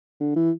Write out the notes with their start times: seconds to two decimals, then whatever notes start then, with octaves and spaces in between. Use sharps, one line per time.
0.20 D3
0.35 E3